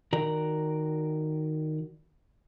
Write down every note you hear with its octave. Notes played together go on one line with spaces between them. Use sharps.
D#3 F#4 A#4 D5 A#5